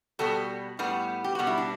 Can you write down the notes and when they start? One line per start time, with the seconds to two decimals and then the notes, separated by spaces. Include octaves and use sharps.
0.19 B2 G3 B3 F#4 A4
0.79 A2 G3 B3
1.24 G4
1.35 B2 G3 B3 F#4
1.47 E4
1.58 D4